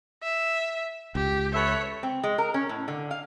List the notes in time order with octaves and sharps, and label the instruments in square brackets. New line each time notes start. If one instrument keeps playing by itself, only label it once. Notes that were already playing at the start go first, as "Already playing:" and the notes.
[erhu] E5
[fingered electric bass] C#2 [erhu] G4
[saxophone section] A4 B4 E5 [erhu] C#5
[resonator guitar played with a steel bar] C4
G#3
A#4
C#4
A2
D3
F5